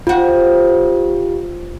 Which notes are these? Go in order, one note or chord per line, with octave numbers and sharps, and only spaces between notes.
C3 F4 F#4